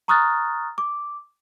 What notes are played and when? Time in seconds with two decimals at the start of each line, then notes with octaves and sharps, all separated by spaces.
0.08 A#5 C#6 D#6 F6 F#6 A6
0.78 D6